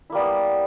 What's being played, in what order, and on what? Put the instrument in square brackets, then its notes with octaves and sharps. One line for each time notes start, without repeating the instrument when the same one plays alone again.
[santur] E4
A#3
G3
B3